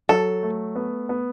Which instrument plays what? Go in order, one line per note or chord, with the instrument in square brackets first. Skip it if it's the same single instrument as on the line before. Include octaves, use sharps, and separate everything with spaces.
[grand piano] F#3 [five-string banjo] A4
[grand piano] A3
B3
B3